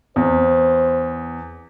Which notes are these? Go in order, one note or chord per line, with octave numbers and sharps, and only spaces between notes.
E2 C5